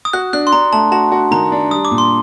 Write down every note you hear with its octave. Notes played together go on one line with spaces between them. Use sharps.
D#6
F#4 F#6
D4 F#6
C6
D4 A#5
A3 A5
F#4 A5
F#4
D#3 A#5
D4
G3 D#6
D6
A#2
C6